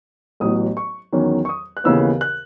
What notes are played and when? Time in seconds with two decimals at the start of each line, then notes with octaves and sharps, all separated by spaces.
0.40 A1 A2 F#3 B3 D#6
0.77 C#6
1.13 E2 D#3 F#3 C#4
1.45 C#6
1.49 D#6
1.77 F#6
1.84 D#2 C#3 E3 B3 E6
2.21 F#6